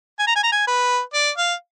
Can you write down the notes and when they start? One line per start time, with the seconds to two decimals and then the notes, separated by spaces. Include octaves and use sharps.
0.19 G#5
0.27 A#5
0.36 G#5
0.43 A#5
0.52 G#5
0.67 B4
1.14 D5
1.38 F5